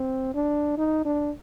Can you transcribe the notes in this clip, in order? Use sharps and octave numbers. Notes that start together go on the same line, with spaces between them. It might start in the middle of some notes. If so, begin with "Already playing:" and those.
Already playing: C4
D4
D#4
D4